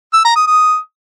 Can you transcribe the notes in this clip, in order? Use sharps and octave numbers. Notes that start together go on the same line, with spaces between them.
E6
A#5
D#6
D#6